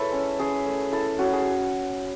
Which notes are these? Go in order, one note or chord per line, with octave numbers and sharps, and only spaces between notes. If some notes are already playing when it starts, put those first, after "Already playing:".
Already playing: G#3 E4 A4 B4 C#5 E5
C#4
C#4 G#4
A3
E4 A4
C#4 F#4
G#4